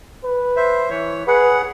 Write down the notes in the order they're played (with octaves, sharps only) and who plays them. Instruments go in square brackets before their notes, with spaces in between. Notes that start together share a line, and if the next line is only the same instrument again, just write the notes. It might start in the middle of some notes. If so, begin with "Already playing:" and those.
[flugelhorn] B4
[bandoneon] C5 E5
E3 C#5
[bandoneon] G#4 F#5 [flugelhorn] B4